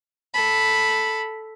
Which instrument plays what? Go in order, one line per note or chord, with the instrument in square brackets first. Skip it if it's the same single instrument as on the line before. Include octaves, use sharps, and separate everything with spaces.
[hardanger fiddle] A4 B5